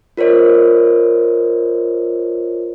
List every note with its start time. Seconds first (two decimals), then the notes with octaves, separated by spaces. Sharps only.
0.17 F4 A#4 C5 C#5 D#5